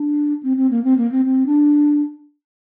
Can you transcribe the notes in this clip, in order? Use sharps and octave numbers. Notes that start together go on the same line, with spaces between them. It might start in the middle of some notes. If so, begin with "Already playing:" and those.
Already playing: D4
C4
C4
A#3
C4
A#3
C4
C4
D4